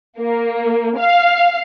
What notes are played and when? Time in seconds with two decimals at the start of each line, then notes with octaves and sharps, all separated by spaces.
0.20 A#3
0.98 F5